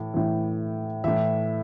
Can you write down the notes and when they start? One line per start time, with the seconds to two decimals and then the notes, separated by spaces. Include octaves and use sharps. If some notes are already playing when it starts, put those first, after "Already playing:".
Already playing: A2 E3
0.14 A2 E3
1.04 A2 E3 E5